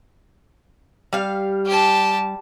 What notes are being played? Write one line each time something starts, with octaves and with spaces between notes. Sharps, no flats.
G3 F5
G4 A5